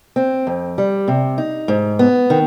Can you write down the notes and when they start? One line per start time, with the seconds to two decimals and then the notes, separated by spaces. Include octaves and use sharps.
0.16 C4
0.47 F2
0.78 G3
1.08 C3
1.38 D#4
1.68 G#2
1.99 B3
2.30 D#3